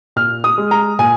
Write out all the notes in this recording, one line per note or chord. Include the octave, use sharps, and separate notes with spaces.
A#2 F6
D#6
G#3
A#5
A#2 G#5